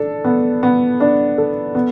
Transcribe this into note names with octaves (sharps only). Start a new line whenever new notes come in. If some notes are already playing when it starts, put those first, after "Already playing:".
Already playing: D4 A4
B3
B3
D4
A4
B3